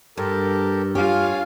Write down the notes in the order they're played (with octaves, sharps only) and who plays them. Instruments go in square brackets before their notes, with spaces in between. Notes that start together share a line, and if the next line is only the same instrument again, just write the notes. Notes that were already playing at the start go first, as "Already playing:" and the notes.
[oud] G2 [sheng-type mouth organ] G4 A4 A#4
[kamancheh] F4 F5 [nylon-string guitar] G4 [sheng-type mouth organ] C#5 G#5